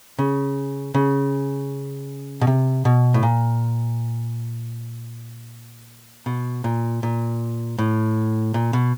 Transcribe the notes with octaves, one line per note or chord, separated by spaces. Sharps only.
C#3
C#3
B2
C3
B2
A2
A#2
B2
A#2
A#2
A2
A#2
B2